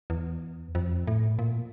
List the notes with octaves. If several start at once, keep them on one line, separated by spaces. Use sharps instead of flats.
E2
F2
A2
A#2